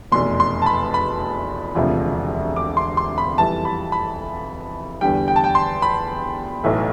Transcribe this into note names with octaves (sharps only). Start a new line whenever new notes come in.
F1 E2 B2 C6
C6
A5
B5
B5
E1 D2 C3 F3
D6
C6
C6
B5
F2 E3 G3 A5
B5
B5
E2 D3 G3 G5
G5
A5
G5
C6
B5
B1 A2 E3 A3